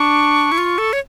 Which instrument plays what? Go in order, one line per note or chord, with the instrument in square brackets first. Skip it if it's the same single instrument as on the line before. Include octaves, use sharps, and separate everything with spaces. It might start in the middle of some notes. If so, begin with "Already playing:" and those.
Already playing: [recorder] D4 [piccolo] C#6
[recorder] E4
F4
A4
C#5